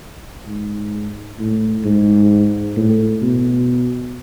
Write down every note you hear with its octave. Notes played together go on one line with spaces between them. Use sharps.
G#2
A2
G#2
A2
B2